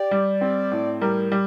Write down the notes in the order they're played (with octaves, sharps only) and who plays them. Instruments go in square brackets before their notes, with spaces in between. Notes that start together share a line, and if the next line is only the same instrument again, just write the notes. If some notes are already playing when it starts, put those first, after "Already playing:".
Already playing: [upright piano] G4 [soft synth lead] D5
[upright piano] G3
C4
A2
[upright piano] G3 [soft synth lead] A#4
[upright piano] G3